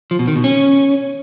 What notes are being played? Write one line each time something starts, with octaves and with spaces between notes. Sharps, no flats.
F3
B2
D#3
B2
C#4